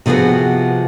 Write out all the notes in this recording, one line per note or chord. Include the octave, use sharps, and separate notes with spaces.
C3 F3 B3 F#4 G#4